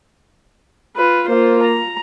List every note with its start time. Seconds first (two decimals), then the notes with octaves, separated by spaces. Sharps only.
0.97 F4 B4
1.29 A#3 F4 C5
1.64 A#5